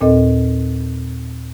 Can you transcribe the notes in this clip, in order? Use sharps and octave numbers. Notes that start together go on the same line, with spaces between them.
D#2 A#2 C4 A4 D#5